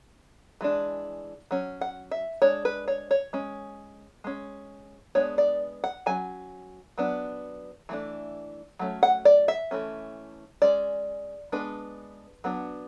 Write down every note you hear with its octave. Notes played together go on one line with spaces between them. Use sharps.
E3 G#3 D4
F#3 C#4
F#5
E5
G#3 D4 C#5
B4
C#5
C#5
G#3 C#4
G#3 C#4
G#3 B3 D4 C#5
D5
F#5
F#3 C#4 G#5
F#3 B3 D4
E3 A3 D4
F#3 A3 C#4
F#5
D5
E5
E3 A3 C#4
G#3 C#4 D5
G#3 B3 D4 B4
F#3 B3 D4